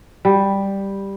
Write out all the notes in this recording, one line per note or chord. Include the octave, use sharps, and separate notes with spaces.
G3